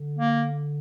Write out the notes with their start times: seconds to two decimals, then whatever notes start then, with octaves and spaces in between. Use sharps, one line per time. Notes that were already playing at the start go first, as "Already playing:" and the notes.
Already playing: D3
0.19 A#3